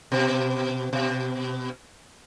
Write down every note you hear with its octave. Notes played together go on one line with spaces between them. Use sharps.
B2
B2